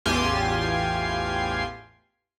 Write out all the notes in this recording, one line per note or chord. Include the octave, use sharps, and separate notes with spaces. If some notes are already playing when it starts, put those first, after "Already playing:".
A1 E2 F4 G4 G#5 C6